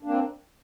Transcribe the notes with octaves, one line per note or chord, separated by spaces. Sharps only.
A#3 C4 D4